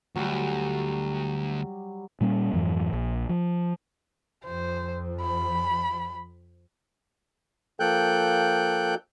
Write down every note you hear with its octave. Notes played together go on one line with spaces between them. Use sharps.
D2 F#3 G3
A#2 G3 A#3 C#4
F2 G#2 E3 F#3
A#1
F3
F2 F3 C5
B5
F3 A#3 A4 G5 F#6 G6